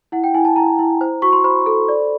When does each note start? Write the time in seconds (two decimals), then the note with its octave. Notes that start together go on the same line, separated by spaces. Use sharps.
0.12 E4 F#5
0.24 G5
0.34 E4 G#5
0.45 A5
0.56 E4 A#5
0.79 E4
1.01 C5
1.22 F#4 C#6
1.33 C6
1.44 C5 B5
1.66 A4
1.89 D5